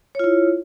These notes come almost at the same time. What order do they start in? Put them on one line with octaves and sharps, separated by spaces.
C#5 F4 E4